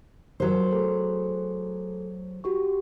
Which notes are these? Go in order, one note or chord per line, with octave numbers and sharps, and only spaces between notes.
F#3 A#4 C5
A3 G#4 A4
F#4 G4 C#6